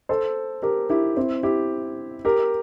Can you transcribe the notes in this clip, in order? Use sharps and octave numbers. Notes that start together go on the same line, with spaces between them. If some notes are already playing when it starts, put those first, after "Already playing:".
A4 C5
G4 A#4
E4 G4
C4 E4
E4 G4
G4 A#4